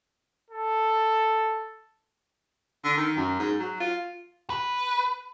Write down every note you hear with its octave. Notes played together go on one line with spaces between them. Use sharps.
A4
D3
D#3
F#2
G#2
F#3
F4
B4